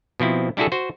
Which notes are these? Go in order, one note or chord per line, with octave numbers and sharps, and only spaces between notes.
B2 F3 C4 E4
G3 D4 E4 F#4 G#4 A4
F#4 C5